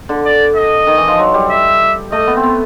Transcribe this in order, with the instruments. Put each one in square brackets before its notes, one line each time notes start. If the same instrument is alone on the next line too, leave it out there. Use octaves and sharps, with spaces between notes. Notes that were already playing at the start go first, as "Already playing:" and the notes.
[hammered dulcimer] D3
[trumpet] D5
D#5
[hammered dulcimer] D#3
E3
F3
F#3
G3
[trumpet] E5
[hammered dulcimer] A3 [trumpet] D#5
[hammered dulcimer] B3
C4
B3